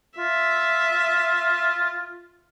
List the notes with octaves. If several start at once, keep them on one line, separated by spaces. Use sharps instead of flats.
F4 E5